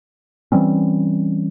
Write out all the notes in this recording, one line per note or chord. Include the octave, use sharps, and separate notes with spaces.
E3 G3 C4 C#4